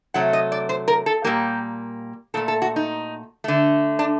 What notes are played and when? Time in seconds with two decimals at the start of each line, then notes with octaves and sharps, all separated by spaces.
0.14 C3 F#3 A3 F#5
0.33 D#5
0.52 D5
0.69 C5
0.88 A#4
1.06 A4
1.24 A#2 G3 A#3 G4
2.34 A#2 A3 A4
2.48 A4
2.62 F#4
2.76 D#4
3.44 D3 A3
3.99 D4